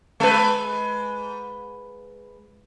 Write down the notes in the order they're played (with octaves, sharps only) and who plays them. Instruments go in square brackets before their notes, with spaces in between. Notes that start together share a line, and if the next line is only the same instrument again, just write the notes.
[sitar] G#3 B4